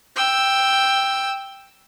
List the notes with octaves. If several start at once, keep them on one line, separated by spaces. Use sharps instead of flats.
G5 E6